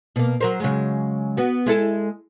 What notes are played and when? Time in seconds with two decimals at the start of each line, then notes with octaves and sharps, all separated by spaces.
0.16 B2 A#3
0.41 F#3 A#4 C5
0.60 C#3 F#3 G#3
1.37 B3 F#4
1.66 G#3 E4 A4